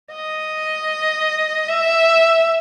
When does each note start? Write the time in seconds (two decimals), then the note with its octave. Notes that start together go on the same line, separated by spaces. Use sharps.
0.12 D#5
1.69 E5